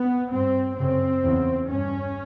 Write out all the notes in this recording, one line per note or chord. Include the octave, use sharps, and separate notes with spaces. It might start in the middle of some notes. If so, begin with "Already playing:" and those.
Already playing: B3
G2 C4
F#2 C#3 C4
E2 C#3
G2 C#4